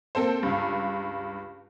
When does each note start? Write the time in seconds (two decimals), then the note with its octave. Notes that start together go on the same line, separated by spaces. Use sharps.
0.15 A#3 C4 A4 C5
0.43 C#2 G2